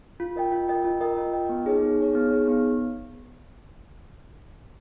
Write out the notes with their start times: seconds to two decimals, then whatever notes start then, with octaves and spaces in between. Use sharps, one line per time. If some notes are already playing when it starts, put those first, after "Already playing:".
0.20 F4
0.36 A#4 D#5 G5
0.52 F4
0.68 A#4 D#5 G5
0.85 F4
1.01 A#4 D#5 G5
1.17 F4
1.33 A#4 D#5 G5
1.49 B3
1.65 D#4 G#4 C#5
1.82 B3
1.99 D#4 G#4 C#5
2.15 B3
2.31 D#4 G#4 C#5
2.48 B3